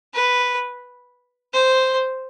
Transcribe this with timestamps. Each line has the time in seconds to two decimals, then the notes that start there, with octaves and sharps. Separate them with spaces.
0.14 B4
1.53 C5